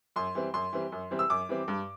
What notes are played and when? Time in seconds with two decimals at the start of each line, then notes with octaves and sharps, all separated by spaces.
0.16 F#2 C6
0.35 E3 G3 C4
0.54 F#2 C6
0.73 E3 G3 C4
0.92 F#2
1.11 E3 G3 C4
1.19 E6
1.30 F#2 D6
1.49 E3 G3 C4
1.68 G2